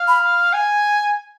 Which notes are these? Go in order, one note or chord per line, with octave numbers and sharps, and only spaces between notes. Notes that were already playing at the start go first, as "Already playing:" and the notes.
Already playing: F5
B5
G#5